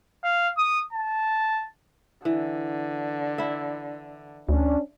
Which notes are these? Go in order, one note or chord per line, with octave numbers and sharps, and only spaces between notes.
F5
D#6
A5
D3 E3
E4 E5
D2 C#4 D4